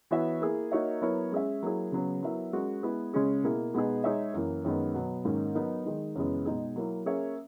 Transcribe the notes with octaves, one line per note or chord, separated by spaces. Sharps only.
E3 B3 F#4 C#5 E5
A#3 E4 G#4
A#3 D#4 F#4 C#5 E5
F#3 B3 E4 A#4 C#5
G#3 C#4 G#4 C#5 E5
F#3 A#3 E4 G#4
C#3 F#3 B3
F#3 B3 E4 A#4 E5
G#3 C#4 F#4 A#4
G#3 B3 E4 G#4 B4
C#3 G#3 C#4 G#4
B2 A#3 E4 G#4
B2 G#3 B3 D#4 G#4
G#3 D#4 G#4 C#5 E5
F#2 E3 A#3
F#2 D#3 G#3 B3
B2 F#3 B3
G#2 D#3 A#3 C#4
F#3 B3 D#4 A#4
D#3 G#3 D#4
F#2 C#3 E3 G#3 B3
B2 G#3 D#4 G#4
F#3 A#3 E4
A#3 C#4 G#4 C#5 E5